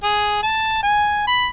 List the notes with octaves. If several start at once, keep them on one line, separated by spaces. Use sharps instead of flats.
G#4
A5
G#5
B5